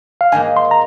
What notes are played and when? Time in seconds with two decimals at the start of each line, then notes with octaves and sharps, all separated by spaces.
0.21 F5
0.32 G#2 D#3 A#3 D#4 G#5
0.57 C6
0.71 A#5